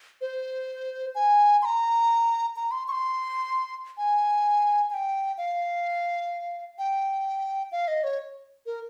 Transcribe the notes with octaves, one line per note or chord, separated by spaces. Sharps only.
C5
G#5
C6
A#5
A#5
C6
C#6
C6
G#5
G#5
G5
F5
G5
F5
D#5
C#5
A#4